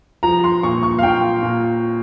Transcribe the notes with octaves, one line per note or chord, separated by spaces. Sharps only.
F3 A#5
C6
A#2 C#6
C#6
F5
A#2 G5
A#2